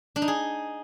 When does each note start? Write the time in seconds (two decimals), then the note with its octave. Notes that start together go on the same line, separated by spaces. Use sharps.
0.16 D4
0.22 D#4
0.28 G#4